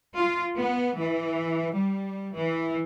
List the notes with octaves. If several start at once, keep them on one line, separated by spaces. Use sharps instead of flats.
F4
B3
E3
G3
E3